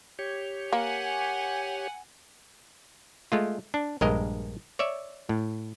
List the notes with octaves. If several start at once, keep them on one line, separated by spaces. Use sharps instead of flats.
G4 C#5
A#3 F#5 G#5
G#3 A3 F4
D4
A#1 G2 G#3 A#4 D#5
C#5 D5 E5
A2